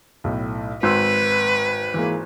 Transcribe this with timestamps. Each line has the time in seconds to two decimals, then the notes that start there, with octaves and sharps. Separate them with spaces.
0.24 B1 A2
0.83 G#1 B4 C6 E6
1.94 E3 G#3 A#3